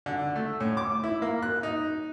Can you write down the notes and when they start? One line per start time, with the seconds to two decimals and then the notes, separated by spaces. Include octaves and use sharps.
0.06 D3
0.36 A3
0.60 A2
0.77 D6
1.03 E4
1.22 A#3
1.43 F#6
1.63 D#4